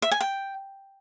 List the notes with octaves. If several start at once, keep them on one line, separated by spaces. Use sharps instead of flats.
E5
G#5
G5